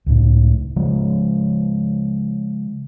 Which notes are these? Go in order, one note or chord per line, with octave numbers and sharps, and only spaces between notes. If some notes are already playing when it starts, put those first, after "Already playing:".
C#2 A2
C#3 F3 G#3